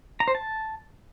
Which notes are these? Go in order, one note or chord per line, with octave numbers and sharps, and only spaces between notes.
A#5
C5
A5